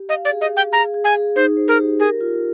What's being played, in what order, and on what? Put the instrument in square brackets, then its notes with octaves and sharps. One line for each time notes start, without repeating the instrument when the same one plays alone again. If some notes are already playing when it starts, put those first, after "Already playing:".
Already playing: [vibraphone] G4
[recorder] D#5 [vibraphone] F5
[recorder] D5
[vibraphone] G#4
[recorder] D#5
[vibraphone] F5
[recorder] G5
[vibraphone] G#4 [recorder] A#5
[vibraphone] G#4
[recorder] G#5
[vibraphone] G#4
[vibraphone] D#4 [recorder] C5
[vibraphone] C5
[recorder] A#4
[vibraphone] G4
[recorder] G#4 [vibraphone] A#4
[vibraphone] F4